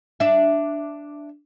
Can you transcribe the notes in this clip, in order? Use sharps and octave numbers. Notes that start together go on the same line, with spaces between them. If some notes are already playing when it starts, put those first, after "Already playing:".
D4 E5